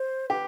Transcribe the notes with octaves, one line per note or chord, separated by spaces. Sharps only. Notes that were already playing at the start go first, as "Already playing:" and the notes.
Already playing: C5
G4 B4